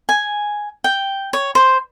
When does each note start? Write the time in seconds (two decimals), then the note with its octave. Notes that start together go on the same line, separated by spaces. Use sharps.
0.09 G#5
0.84 G5
1.33 C#5
1.55 C5